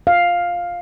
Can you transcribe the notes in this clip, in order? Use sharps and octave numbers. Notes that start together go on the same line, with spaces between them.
F5